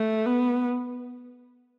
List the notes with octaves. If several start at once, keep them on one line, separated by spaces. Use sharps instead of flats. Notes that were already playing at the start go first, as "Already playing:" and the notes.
Already playing: A3
B3